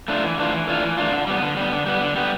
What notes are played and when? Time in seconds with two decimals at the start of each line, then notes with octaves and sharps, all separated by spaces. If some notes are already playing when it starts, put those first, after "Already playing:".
0.08 A3 D4 F4
0.23 E3
0.38 A3 D4 F4
0.52 E3
0.67 A3 D4 F4
0.83 E3
0.97 A3 D4 F4
1.12 D3
1.27 G3 B3
1.42 D3
1.57 G3 B3
1.72 D3
1.86 G3 B3
2.01 D3
2.16 G3 B3